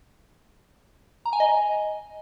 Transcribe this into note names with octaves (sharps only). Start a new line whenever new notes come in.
A#5
G#5
D#5